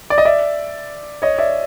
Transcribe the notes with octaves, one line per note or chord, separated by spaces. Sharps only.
D5
D#5
D5 E5
C#5 D#5
D5 E5